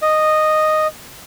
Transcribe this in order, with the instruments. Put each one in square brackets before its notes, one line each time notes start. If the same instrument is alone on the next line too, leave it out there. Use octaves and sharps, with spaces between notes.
[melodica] D#5